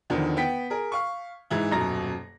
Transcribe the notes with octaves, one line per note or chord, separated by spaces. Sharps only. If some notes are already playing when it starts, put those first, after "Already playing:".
E2 D3 D#3 F3
B3 G5 B6
G#4 A#4
F5 C#6
G#2 E3 E4
D#1 F#2 B2 A#5 A#6